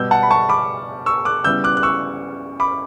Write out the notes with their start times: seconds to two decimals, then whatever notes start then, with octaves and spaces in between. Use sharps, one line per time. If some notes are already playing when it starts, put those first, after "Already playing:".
Already playing: B2 G3 B3 E6 G6
0.11 F#5 A5
0.23 B5
0.31 A5 C#6
0.49 B5 D6
1.06 C#6 E6
1.25 D6 F#6
1.44 C#3 G3 B3 E4 E6 G6
1.64 D6 F#6
1.77 F#6
1.83 C#6 E6
2.60 B5 D6